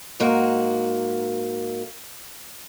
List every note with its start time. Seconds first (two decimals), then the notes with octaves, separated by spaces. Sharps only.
0.20 G#2 A#3 F#4